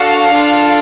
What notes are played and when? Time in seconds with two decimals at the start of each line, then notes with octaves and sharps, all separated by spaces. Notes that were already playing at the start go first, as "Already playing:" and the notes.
Already playing: D4 F#4 A4 F5
0.33 D4 F4 A4